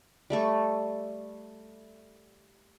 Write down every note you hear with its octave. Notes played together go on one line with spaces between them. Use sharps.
G3 A3 A4 C#6